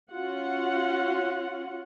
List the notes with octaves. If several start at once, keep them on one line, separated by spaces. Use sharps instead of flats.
C#4 F4 F#4 F#5